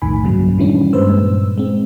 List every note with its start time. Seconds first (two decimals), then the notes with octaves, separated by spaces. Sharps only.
0.02 B1 F2 A2 D#3 G#5 B5
0.23 G2 A#2 C#3 F#3
0.58 D#3 E3 G3 C#4 D4
0.93 G2 A#2 G#3 B4 C5 E6
1.58 G#3 C4